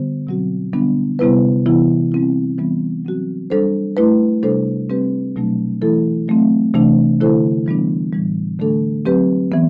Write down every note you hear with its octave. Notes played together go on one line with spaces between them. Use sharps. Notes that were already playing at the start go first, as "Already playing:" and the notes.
Already playing: D3 G3 B3 F#4 C5
B2 F#3 C4 F#4
D3 G3 B3 D4
C3 G3 B3 E4 B4
C3 E3 B3 E4
G3 C4 E4
E3 G3 B3
F#3 C4 F#4
G3 D4 A4 C5
A3 E4 B4
C3 G3 D4 A4 C5
G3 C4 G4 B4
B2 F#3 A3 D4
E3 A3 E4 A4
F#3 A3 C4
C3 E3 A3 D4
D3 A3 E4 A4 C5
E3 G3 B3 D4
A2 E3 G3
D3 A3 D4 A4
F#3 C4 G4 B4
E3 B3